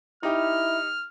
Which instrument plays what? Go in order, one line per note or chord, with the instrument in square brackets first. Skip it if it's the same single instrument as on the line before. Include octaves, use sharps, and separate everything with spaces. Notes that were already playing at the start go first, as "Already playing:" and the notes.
[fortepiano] D#4 G4 [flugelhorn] E4 [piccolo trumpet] F6